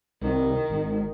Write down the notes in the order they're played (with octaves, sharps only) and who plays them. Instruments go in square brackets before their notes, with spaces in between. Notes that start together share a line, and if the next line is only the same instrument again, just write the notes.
[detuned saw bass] C2 [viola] D#3
[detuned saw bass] G#1